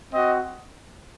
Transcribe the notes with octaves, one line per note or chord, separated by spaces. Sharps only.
C4 F#4 D#5